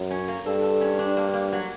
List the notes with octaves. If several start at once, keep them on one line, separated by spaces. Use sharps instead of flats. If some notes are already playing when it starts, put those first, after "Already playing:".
Already playing: F#2
C#4
A#3
G2 A4
A4
C#4
D4
A#3
A#3
F#3